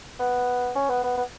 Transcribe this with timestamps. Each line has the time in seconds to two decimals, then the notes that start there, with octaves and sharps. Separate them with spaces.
0.20 B3
0.75 C#4
0.89 B3
1.04 B3
1.18 B3